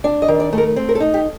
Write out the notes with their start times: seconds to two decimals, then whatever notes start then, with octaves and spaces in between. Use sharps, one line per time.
0.04 D4
0.22 D#5
0.28 D#3
0.40 D5
0.53 A3
0.58 A#4
0.76 C4
0.89 A#4
0.95 A4
1.00 D#4
1.14 G4